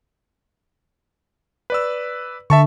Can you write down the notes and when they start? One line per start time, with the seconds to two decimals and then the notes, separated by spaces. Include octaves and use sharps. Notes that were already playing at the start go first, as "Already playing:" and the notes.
1.70 B4 D5 E6
2.50 D3 E5 A5 C#6